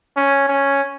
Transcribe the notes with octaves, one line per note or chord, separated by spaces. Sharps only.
C#4
C#4